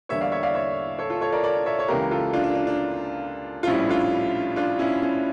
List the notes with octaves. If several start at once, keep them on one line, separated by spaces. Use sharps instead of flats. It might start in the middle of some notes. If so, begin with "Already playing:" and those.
E2 D3 G3 A#3 C#5 E5
D5 F5
C#5 E5
D5 F5
C#5 E5
A4 C#5
F4 A4
A4 C#5
A#4 D5
A#4 D5
C#5 E5
C#5
C#2 C#3 E3 A#3 G4 A#4
F4 A4
D4 F4
D4
D4
D4
F4
A#1 A2 G3 C#4 E4
D4 F4
D4 F4
C#4 E4
C#4